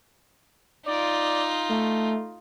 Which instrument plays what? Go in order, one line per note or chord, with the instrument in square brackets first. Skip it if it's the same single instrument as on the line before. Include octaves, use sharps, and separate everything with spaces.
[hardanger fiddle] D#4 F4 [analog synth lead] D5
[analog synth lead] A3